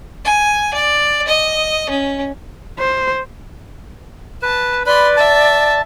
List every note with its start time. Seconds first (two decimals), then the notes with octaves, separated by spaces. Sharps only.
0.25 G#5
0.74 D5
1.28 D#5
1.90 C#4
2.79 C5
4.42 B4 A5
4.86 B4 D5 B5 C6
5.17 E5 A5